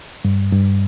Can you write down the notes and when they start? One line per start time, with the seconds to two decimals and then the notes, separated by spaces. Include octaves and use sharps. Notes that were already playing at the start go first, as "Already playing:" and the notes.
0.25 G2
0.52 G2